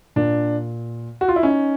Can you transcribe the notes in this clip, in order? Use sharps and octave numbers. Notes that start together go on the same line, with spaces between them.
A#2 D4
F#4
F4
E4
C#4 D#4